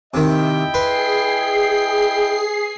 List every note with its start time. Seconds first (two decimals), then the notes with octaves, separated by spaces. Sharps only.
0.14 C3 D#3 E4 D#5 G5
0.74 G#4 B4 C6 C7